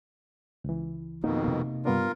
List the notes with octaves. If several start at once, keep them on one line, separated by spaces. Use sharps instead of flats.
C#2 E3
F2 B2 D#3 A#3 D#4
C3 A#3
G2 B3 D4 F4 A#4